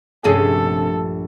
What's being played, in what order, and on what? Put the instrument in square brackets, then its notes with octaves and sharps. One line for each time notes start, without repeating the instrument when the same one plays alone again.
[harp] A#1 G2 A3 [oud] C3 C#4 G#4 [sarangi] A4